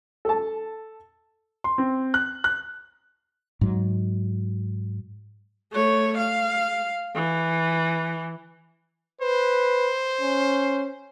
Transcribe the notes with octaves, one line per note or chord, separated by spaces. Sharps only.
A4 A5
C6
C4
F#6
F#6
G#2 F#3
A3 C#5
F5
E3
B4 C5
C#4